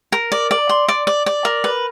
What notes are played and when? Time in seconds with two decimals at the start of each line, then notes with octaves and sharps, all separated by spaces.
0.12 A#4
0.32 D5
0.51 D5
0.69 C6
0.88 D5
1.07 D5
1.26 D5
1.45 A#4
1.64 B4